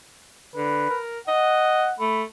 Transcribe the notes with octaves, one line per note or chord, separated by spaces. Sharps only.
D3 B4
A#4
D#5 F#5
A3 B5